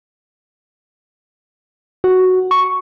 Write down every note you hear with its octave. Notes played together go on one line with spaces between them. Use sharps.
F#4
C#6